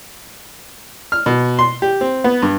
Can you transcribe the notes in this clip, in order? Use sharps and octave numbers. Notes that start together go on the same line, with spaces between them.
F6
B2
C6
G4
C4
B3
G2